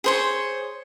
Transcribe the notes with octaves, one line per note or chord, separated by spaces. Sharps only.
G#4 C5 C#5